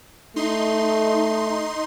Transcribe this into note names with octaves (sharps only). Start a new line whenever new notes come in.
A3 D#4 C6